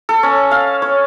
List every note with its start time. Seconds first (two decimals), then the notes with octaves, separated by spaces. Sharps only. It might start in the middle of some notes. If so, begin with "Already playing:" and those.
0.09 A4
0.23 C#4
0.51 F5
0.82 C#5